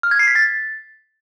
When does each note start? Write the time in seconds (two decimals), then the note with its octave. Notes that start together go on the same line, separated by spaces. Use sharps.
0.03 F6
0.11 G#6
0.19 C7
0.27 B6
0.35 A6